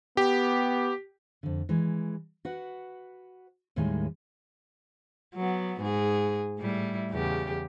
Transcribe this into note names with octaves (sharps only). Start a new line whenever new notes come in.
B3 G4
F2 D3
E3 G#3
F#4 B4 F#5
D#2 A2 D#3 G3 G#3 G#5
F#3 B3
G#2 G#4
A2 G3 E4
E2 C#3 G4